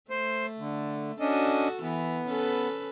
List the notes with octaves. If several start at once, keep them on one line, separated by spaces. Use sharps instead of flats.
A3 C5
D3
C#4 D4 F#4 A4 D#5
E3 B3
C#4 A4 B4